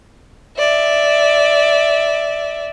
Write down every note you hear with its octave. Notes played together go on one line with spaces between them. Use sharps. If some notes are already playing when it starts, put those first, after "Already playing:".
D5 E5